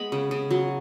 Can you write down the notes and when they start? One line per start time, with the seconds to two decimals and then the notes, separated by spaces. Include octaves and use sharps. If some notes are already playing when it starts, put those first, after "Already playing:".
Already playing: G#3 B3 B5
0.12 C#3
0.31 C#3
0.51 F#3